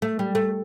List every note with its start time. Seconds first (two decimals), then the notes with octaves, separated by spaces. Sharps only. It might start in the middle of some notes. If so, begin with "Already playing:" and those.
0.02 A3
0.19 G3
0.35 A3